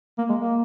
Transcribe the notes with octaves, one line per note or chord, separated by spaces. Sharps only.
A#3
G#3
A#3